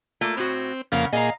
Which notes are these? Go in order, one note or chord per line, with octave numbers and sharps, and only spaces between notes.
A3 A#3 F4
A2 C4 F#4
F2 C#3 A#3 A#4 F5 F#5
A#2 G#4 D#5 F5 A#5